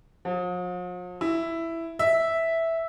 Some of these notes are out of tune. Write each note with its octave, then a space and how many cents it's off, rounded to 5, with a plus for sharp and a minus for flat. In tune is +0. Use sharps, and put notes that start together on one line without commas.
F3 +45
E4 +5
E5 -5